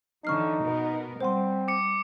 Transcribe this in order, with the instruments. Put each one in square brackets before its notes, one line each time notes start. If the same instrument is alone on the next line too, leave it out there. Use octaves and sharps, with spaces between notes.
[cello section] D3 E3 F#3 [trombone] D#4 [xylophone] C#6 F6 C7
[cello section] B2 B3 A#4
[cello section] G3 [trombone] C4 [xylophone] C5 F#5 C6
[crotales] D6 C#7